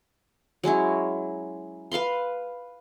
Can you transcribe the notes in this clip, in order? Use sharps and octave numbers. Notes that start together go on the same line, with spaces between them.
F#3 G#3 C#4 E4
B4 F5 B5 C6